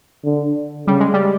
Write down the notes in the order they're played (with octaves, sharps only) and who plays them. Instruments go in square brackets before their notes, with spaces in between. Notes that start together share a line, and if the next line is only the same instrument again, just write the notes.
[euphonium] D3
[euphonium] C#3 [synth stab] G3
[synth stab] G#3
G3